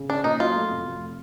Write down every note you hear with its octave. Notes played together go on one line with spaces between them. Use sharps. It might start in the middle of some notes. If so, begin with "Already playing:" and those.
Already playing: C#3
C#4 D4
A#2 D#4
F#3 F4
A3
F1
F1